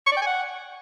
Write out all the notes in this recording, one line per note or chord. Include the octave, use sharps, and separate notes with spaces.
C#6
D5
G5
G#5
F#5